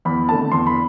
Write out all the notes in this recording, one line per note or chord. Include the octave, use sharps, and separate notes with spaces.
E2 B5
D3 A3 C4 A5
E2 C6
B5